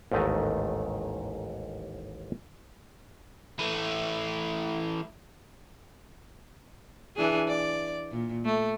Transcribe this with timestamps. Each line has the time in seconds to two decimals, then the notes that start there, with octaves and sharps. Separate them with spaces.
0.11 A1 D#2 G#2 D#3 A3 D#5
3.59 E3 A3
7.16 E3 D4 G#4
7.48 D5
8.11 A#2
8.45 A3